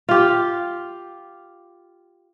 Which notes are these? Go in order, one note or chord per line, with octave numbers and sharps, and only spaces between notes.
F4 G4